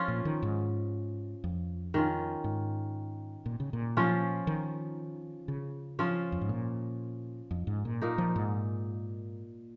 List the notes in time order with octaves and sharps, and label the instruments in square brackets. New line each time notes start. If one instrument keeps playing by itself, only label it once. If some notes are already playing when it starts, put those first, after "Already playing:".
Already playing: [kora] F3 C#4 F4
[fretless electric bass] A#2
D#3
G#2
F2
[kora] D#3 C#4 F4
[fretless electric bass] G#2
A#2
C#3
A#2
[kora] F3 C#4 F4
[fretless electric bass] D#3
C#3
[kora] F3 C#4 F4
[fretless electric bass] F2
G#2
A#2
F2
G#2
A#2
[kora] A#2 A#3 D#4
[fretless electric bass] F3
G#2